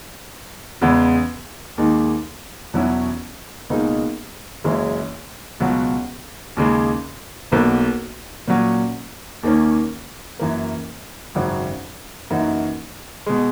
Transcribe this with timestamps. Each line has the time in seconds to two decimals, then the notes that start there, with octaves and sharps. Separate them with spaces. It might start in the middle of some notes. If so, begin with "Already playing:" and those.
0.81 E2 C#3 G#3 B3
1.78 D#2 D#3 G#3
2.74 E2 B2 F#3 C#4 E4
3.70 C#2 B2 A#3 D#4 G#4
4.64 F#1 F#2 E3 G#3
5.60 C#2 B2 F#3
6.57 D#2 C#3 G#3
7.52 B1 B2 A#3
8.48 A#2 F#3 C#4
9.43 D#2 D#3 A#3 C#4
10.39 F#2 E3 A#3
11.35 G#1 F#2 C#3 F#3
12.30 F#2 E3 A#3 D#4 F#4
13.26 B2 G#3